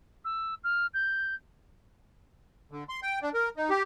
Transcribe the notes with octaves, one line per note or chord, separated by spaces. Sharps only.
E6
F6
G6
D3
C6
G5
D4
A#4
D#4
G4